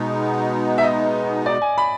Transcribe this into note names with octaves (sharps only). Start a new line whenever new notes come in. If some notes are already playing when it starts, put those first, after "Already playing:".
Already playing: B2 G#3 B3 D#4
E5
D#5
D5
G#5
B5